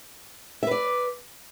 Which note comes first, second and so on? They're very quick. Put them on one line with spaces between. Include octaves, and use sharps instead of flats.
E5 B4 D5